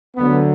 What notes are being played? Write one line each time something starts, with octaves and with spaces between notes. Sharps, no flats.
D2 D3 F#3 B3